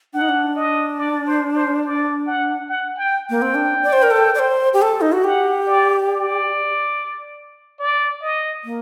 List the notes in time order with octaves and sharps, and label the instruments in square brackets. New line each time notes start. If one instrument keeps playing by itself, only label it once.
[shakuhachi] D4 [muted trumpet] F#5
[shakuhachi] D#4
D4
[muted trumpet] D#5
D5
C5
C5
D5
F#5
F#5
G5
[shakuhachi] A#3 [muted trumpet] G5
[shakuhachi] C4
D4
D5
C5
A#4
A4
D5
C5
G4
A4
D#4
F#4
[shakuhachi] G4 [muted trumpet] F#5
[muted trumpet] D5
D5
D5
D#5
[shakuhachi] A#3